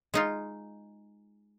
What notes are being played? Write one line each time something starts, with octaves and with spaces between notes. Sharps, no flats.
G#3 D#4 F4